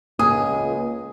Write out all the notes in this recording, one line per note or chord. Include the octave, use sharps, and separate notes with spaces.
C#2 A#3 G#4 D#6